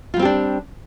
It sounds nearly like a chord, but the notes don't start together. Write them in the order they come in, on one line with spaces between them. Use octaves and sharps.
F4 G3 C4 G4 D4